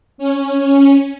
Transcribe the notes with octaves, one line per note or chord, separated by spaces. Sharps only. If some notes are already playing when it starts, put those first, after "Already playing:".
C#4